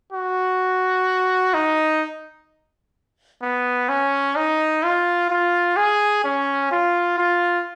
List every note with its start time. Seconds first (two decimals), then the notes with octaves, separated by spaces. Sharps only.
0.12 F#4
1.54 D#4
3.42 B3
3.89 C#4
4.36 D#4
4.83 F4
5.30 F4
5.77 G#4
6.24 C#4
6.71 F4
7.18 F4